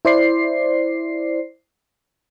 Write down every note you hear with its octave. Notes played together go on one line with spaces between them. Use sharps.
E4 C5 D5 C7